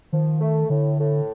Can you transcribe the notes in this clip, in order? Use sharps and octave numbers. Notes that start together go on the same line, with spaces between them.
D#3 F3
A3
A2 D3
A2